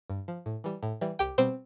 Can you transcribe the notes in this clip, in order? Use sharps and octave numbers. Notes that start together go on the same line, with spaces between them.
G2
F3
A2
E3 G3
A2
E3 G3
C2 G4 G5
B2 G3 C4 C5